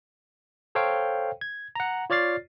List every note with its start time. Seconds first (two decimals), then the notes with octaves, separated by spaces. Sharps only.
0.75 A4 C5 C#5 F5 G5
1.41 G#6
1.75 F#5 A#5
2.10 F4 C#5 D5 F6 A6 C7